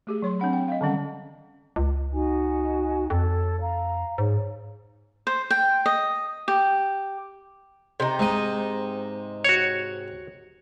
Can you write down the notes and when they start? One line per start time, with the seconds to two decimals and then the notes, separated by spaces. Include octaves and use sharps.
0.07 A3 G4 G#4
0.22 F#3 C#5 C6
0.40 C4 D4 F#5 B5
0.53 G5
0.68 D#5 F5
0.81 D3 D#3 G3 C#4 F#5
1.76 C#2
2.12 D#4 F#4 G#5
3.10 F2 A4 C#5
3.60 F5 A#5
4.18 G#2 G#4 C#5
5.27 C5
5.51 G5
5.86 D#5
6.48 G4
8.00 C3 D#4
8.19 G#2 D#5
9.44 F#4 C#5